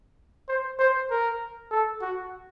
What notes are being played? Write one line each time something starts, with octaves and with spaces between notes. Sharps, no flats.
C5
C5
A#4
A4
F#4